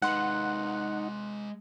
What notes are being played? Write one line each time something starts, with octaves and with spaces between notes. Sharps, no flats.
G#3 D#4 B4 F#5 C6 F#6